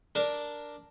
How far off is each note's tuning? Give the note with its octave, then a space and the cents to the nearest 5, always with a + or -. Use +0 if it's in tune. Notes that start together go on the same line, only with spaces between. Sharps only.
D4 +0 A#4 +0